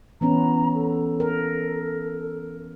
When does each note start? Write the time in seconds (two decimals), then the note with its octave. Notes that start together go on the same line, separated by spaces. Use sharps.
0.21 E3 B3 C#4 A#5
0.74 A4
1.20 A#4